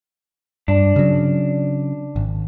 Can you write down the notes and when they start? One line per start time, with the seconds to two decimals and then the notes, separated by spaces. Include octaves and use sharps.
0.68 G2 D4
0.96 C#3 F#3
2.16 G#1